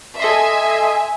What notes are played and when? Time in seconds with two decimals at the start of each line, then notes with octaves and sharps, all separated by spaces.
0.20 A4 D#5 E5 G#5 C6